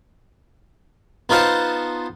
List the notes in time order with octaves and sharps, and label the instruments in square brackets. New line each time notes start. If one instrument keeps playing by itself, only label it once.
[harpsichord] B3 D#4 F4 C5 F#5 A5